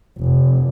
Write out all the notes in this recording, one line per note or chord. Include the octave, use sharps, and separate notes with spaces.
F1